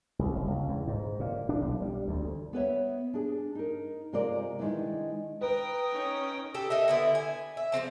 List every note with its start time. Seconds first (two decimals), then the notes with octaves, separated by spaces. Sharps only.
0.19 C2
0.36 F#1
0.48 C#2
0.68 E2
0.87 G#2
1.20 A#2
1.49 D4
1.61 B1
1.82 G3
2.08 D2
2.53 B3 B4 C#5 E5
3.14 D4 G#4
3.55 D#4 A#4
4.13 C3 G#3 F4 A#4 C5 D5
4.59 D#3 G#3 D4 E4 B4
5.41 A#4 B4 G5 D#6
5.91 C#4 D#4
6.54 G4 A4
6.70 D#4 A#4 E5
6.88 D3 B3 E4
7.15 G#5
7.57 E5
7.72 F3 G3 C4 A5